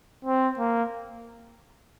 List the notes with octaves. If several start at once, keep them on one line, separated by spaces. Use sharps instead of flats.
C4
A#3